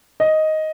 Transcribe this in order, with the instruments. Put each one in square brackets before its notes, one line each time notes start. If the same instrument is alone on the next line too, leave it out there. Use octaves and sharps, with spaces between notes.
[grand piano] D#5